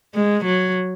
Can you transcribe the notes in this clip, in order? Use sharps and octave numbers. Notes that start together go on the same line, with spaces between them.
G#3
F#3